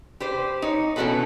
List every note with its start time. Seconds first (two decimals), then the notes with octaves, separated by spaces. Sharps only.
0.20 G4 B4 C5
0.62 D#4 C#5
0.96 B2 E3 C#4 F#4 A4 B4